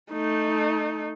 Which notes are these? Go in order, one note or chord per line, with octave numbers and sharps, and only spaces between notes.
A3 D#4